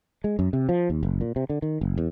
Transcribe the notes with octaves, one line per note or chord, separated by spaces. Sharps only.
G#3
F#2
C3
F3
D#2
F#1
A#2
C3
D3
D#3
F#1
E2